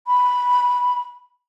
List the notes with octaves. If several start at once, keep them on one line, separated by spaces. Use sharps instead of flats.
B5